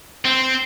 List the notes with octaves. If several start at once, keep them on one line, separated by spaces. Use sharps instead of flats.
C4